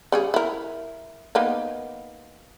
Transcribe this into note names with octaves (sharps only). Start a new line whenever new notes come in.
C#3 G3 G#4
E4 A#4
A#3 B3 D#4